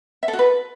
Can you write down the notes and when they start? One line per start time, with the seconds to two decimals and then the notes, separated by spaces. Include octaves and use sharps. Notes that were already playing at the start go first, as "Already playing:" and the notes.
0.23 E5
0.28 A4
0.33 F#4
0.39 B4